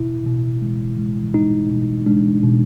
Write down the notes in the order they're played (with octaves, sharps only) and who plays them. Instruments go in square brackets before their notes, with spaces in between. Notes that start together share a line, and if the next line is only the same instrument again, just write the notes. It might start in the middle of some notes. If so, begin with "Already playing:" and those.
Already playing: [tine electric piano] B2 E4
B2
G#3
G#3
G#3 D#4
B2
G#3 D4
B2